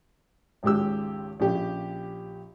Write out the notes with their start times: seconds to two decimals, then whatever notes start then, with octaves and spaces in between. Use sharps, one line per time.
0.63 G#1 C#2 G#3 G4 E6
1.40 A#1 C#3 G4